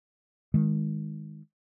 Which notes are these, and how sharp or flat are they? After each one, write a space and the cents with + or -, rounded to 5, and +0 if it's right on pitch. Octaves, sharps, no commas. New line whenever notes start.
D#3 +5 G#3 +0